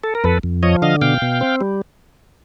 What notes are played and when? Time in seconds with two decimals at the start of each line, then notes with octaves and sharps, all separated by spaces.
0.04 A4
0.15 A#4
0.24 F2 A4 B4
0.43 F2
0.63 F3 C#5 D#5
0.82 D3 D#5 F5
1.01 B2 F5 G5
1.22 B2
1.41 C4
1.61 G3